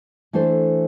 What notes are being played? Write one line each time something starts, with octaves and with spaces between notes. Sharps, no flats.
E3 A3 D4 A4 C5